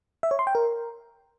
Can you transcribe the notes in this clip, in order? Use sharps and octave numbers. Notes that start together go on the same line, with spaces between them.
E5
C#5
C6
G5
A#4